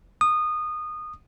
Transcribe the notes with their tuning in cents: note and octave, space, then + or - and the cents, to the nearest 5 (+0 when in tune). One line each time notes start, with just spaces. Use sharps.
D#6 -20